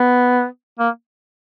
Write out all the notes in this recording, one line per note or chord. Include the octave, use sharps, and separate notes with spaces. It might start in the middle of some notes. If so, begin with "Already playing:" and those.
Already playing: B3
A#3